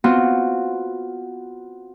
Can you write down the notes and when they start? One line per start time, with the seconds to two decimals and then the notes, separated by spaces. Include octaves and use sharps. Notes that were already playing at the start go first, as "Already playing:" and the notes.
0.04 B3 C4 F4 F#4